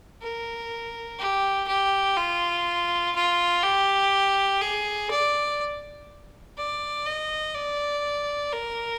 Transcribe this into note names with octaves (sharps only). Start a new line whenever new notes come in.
A#4
G4
G4
F4
F4
G4
G#4
D5
D5
D#5
D5
A#4